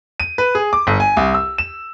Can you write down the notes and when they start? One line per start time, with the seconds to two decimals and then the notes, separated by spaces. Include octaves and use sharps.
0.20 D#7
0.38 B4
0.55 G#4
0.73 D6
0.87 G1
1.00 G#5
1.17 C2
1.34 E6
1.58 E7